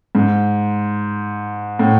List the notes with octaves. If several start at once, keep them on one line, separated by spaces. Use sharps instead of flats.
G#2
A2